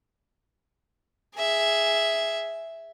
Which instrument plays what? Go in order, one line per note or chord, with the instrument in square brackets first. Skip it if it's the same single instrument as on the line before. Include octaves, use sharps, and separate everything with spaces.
[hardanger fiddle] G#4 E5